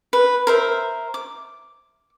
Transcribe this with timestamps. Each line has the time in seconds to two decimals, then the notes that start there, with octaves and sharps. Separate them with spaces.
0.13 B4
0.47 A#4 C5 E5
1.14 D6